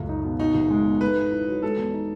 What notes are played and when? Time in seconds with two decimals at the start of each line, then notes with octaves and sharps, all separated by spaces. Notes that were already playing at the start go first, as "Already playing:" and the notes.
Already playing: C#2 F#2 A3
0.09 D#4
0.24 B2
0.39 B2 D#4
0.54 F#1
0.70 G#3
0.85 E2
1.01 A3 B4
1.16 G#2
1.32 E4
1.47 F#3
1.62 G#3 A4
1.78 E2
1.94 D#4